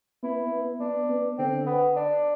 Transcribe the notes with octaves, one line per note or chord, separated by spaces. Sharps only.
B3 E4
B3
B3 D4
B3
D3 C4
B3
D4